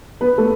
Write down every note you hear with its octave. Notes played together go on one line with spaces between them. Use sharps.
B3 B4
A3 A4